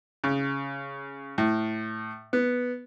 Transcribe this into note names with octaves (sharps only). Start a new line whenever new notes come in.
C#3
A2
B3